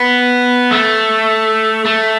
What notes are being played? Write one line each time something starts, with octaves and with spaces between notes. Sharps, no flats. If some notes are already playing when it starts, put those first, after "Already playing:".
Already playing: B3
A3
A3